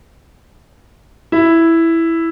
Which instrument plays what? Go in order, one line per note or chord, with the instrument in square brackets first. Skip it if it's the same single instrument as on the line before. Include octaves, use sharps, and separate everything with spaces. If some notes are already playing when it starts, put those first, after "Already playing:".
[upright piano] E4